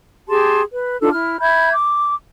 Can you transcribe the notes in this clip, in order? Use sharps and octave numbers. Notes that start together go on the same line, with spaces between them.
G4 G#4 A5 C6
B4
D4 D#4 F4 A4
E4 F6
E5 B5 G6 G#6
D6